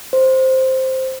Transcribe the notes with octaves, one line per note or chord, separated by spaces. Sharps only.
C5